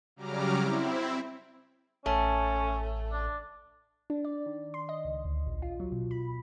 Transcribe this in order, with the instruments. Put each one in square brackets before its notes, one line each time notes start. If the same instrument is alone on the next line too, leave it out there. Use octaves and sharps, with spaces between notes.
[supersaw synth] C#3 F#3 G3 A#5 D6 F6
C4 E4
[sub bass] A1 [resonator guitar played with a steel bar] A3 [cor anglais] C#4
[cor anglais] D4
[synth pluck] D4
D5
D#3
C6
D#5
C#2
D2
A#1
F4
F#3
B2
B5